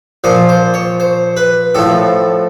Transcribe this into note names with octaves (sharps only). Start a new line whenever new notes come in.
A#2 F3 C5
C5
C#5
C5
B4
A2 F3 A4